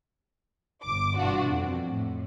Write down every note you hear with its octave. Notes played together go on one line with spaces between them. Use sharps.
G1 D6
G2 B2 E3 D4 F4 F#4
F2
A2